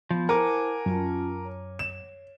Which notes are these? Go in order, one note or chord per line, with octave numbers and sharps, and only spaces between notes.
F3 B3
E4 A#4 C5 F#5 G#5 A5 D6
F#2 C#4 F4 A5
C#5
E7